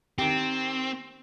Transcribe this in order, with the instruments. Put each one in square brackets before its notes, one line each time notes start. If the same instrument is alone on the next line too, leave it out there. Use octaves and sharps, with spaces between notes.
[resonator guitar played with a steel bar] D#3 G4 [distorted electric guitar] C4